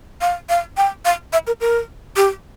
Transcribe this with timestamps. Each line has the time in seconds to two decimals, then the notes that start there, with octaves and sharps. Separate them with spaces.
0.21 F5
0.49 F5
0.77 G5
1.05 F5
1.33 E5
1.47 A#4
1.61 A#4
2.16 G4